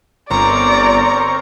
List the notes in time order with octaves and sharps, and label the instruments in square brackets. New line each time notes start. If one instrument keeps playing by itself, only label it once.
[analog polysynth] G1 [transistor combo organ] C4 A#4 C#5 [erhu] D5 [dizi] A#5